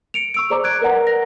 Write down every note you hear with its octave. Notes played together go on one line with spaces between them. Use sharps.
C#7 D7 F7
C#6 E6 D7
G#4 C5 D5 A#5 D6
F#6 G#6 D7
A#4 B4 D5 F#5 A#5
A#6